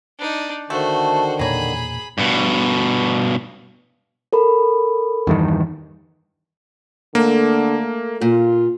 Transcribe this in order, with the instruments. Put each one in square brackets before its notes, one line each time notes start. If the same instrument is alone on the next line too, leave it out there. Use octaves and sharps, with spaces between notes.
[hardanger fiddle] D4 D#4
[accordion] D3 D#3 [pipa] A3 [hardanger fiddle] F#4 C5
[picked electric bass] E1 A#2 [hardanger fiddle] G#4 B5 [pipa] C#5 A#5
[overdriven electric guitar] G2 B2
[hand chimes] A4 A#4 B5
[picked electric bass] E2 G2 D#3
[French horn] D3 [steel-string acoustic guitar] A3 [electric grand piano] A#3
[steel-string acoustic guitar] A#2 [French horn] F4